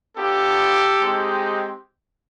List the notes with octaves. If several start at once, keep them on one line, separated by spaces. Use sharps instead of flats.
B3 D4 F4 G4 A4
G#3 C4 D#4 G4